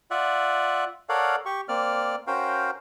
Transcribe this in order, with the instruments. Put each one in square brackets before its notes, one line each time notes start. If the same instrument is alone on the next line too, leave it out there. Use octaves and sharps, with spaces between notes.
[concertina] F4 D5 E5 F#5
A4 A#4 C#5 D5 F5 F#5
G4 C#6
A#3 C4 D5 F6
C#4 F#4 A#4 C5 F5 G5